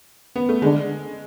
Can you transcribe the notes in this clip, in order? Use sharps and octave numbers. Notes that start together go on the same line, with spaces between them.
B3
A3
D3 G#3